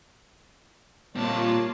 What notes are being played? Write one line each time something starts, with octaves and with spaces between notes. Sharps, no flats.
A#2 G3 A#3 C4 F4 C#5 D5 A5